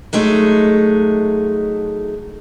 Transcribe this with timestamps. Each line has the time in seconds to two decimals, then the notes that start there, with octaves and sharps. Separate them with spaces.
0.13 F#3 G#3 A3 D#4